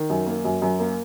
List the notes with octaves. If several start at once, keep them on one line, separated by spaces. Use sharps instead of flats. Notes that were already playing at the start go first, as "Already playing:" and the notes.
Already playing: D#3
F#2
A#3
F#2
F#2
A#3